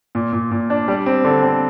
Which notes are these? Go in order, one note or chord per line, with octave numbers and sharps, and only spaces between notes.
A#2
A#2
A#2
D4
G3
C4
D3
C4